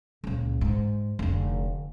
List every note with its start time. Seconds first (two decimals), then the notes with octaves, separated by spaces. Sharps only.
0.24 C#2 A#2
0.61 G#2
1.19 F1 D3